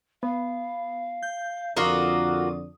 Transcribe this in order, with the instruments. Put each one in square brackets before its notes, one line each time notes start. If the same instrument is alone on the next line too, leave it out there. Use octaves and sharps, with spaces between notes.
[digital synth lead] B3 [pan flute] F5
[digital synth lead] G6
[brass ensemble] F2 D3 [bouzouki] F4 F#4 A#4 [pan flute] D6 [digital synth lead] D#6